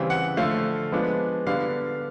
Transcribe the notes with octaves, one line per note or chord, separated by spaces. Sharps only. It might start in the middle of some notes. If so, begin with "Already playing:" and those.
Already playing: C#3 E3 G3 C4
F#5
D3 F3 A3 F5
F3 G#3 B3 D4
D3 G3 B3 D4 F5